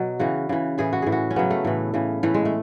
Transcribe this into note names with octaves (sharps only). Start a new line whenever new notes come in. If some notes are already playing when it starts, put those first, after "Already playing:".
Already playing: B2 F#3
C#3 E3 F#4
C#3 E3
A2 E3 G#4
F#4
A2 E3 G#4
F#4
C#4
C#3 F#3 B3
A3
A2 E3
C#3 E3
A2 E3 A3
G#3
A3